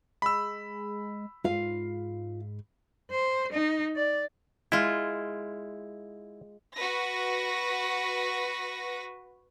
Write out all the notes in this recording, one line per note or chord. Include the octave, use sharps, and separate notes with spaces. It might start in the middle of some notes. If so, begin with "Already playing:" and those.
G#3 B5 E6
G#2 F4 F5
C5
D#4
D5
G#3 E4 F4
F#4 B4 A#6